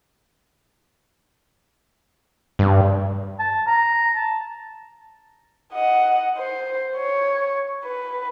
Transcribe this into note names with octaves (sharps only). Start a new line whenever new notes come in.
G2
A5
A#5
A5
D#5 F#5
C5
C#5
B4